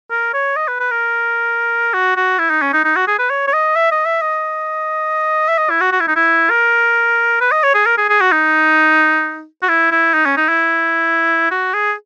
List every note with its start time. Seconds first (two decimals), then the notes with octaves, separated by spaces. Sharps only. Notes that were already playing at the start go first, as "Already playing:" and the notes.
0.11 A#4
0.34 C#5
0.56 D#5
0.68 B4
0.80 B4
0.91 A#4
1.94 F#4
2.16 F#4
2.39 E4
2.50 D#4
2.62 C#4
2.73 D#4
2.85 D#4
2.96 F#4
3.08 G#4
3.19 B4
3.30 C#5
3.47 C#5
3.53 D#5
3.76 E5
3.91 D#5
4.06 E5
4.22 D#5
5.49 E5
5.58 D#5
5.70 E4
5.81 F#4
5.92 F#4
6.00 E4
6.08 D#4
6.16 E4
6.50 A#4
7.40 B4
7.52 D#5
7.63 C#5
7.75 G#4
7.86 A#4
7.98 G#4
8.09 G#4
8.21 F#4
8.32 D#4
9.62 F#4
9.69 E4
9.92 E4
10.14 D#4
10.26 C#4
10.37 D#4
10.49 E4
11.51 F#4
11.74 G#4